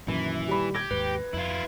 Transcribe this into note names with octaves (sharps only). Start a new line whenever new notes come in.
F#2 A#2 D#3 E3
G3 B5
G4 G#6 A#6
D#2 G#2 B4
F2 E4 F4